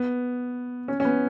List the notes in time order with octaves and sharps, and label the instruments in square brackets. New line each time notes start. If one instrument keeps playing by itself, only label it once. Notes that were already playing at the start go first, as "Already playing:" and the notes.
Already playing: [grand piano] B3
C#4
C#4
B3